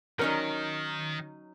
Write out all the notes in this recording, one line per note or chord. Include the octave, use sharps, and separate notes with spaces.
D#3 F#3 C#4 D#4 A#4